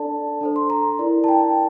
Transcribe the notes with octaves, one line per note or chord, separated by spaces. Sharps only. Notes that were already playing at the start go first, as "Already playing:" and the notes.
Already playing: D4 A4 D5 A5
D4 A4 C5
C6
A#5
E4 A#4 D5
A5
G5